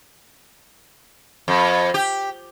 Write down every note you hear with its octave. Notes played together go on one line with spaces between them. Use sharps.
F2
G4